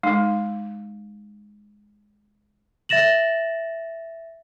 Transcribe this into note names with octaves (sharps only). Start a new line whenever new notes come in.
G#3 D#4
E5 A6 A#6 E7 F#7